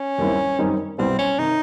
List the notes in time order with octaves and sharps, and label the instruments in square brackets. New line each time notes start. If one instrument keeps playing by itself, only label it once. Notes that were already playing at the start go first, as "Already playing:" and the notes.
Already playing: [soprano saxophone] C#4
[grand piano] D#2 D#3 G3 C4 E4
F#2 D#3 G3 C4 D#4
[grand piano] C2 B2 G3 B3 E4 [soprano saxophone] C4
[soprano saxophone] C#4
[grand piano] C3 D#3 [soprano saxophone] D#4